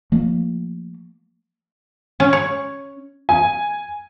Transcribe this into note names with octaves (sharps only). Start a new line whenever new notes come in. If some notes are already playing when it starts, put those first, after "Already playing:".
F3 A3 A#3
C#4
C#5
G#5